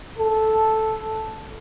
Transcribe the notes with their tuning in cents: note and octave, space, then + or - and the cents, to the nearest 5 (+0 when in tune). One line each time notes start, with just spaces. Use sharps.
A4 -5